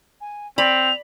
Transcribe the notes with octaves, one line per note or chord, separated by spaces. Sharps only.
G#5
C4 D5 B5 F7